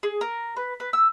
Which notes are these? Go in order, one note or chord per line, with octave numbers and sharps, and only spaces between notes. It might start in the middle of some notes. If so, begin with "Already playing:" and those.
G#4
A#4
B4
B4
E6